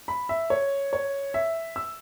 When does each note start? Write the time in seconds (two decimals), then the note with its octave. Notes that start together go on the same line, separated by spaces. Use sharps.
0.08 B5
0.29 E5
0.50 C#5
0.93 C#5
1.34 E5
1.76 E6